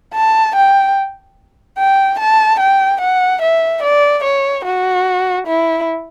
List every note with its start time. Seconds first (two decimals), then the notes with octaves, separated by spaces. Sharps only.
0.14 A5
0.55 G5
1.78 G5
2.19 A5
2.60 G5
3.01 F#5
3.42 E5
3.83 D5
4.24 C#5
4.64 F#4
5.47 E4